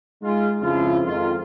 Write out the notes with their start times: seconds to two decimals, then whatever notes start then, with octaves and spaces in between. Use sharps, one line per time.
0.22 G#3 D#4 F4
0.61 F2 C#3 F3 E4 F4
1.05 F2 G#2 D#3 F4